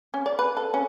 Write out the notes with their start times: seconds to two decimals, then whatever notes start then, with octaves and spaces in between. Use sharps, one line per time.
0.14 C#4
0.26 D5
0.39 B4
0.57 A4
0.74 C#4